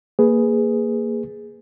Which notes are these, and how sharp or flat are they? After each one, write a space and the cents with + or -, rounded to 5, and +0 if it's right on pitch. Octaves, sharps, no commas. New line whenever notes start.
A#3 -10 G#4 +0 B4 +5